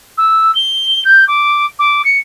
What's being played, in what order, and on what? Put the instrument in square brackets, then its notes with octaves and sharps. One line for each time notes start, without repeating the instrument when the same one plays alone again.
[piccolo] E6
G7
G6
D6
D6
C#7